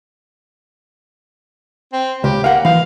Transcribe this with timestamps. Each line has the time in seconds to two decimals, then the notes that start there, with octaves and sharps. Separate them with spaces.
1.93 C4
2.24 C#2 G4
2.44 A#3 F5 F#5
2.65 E3 F5